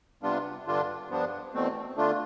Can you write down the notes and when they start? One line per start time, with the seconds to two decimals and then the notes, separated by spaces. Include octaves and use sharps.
0.23 C3 G3 B3 D4 F4
0.66 G2 D3 G3 D4 F4
1.09 G2 F3 B3 D4
1.53 E2 B2 A3 C4
1.96 D3 A3 D4 F4